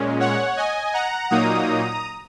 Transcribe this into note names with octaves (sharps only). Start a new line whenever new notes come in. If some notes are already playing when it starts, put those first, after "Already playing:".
Already playing: A#2 G#3 C#4
C#5 F#5
D#5 G#5
F#5 A#5
A#2 F#3 A#3 D#4 A#5 D#6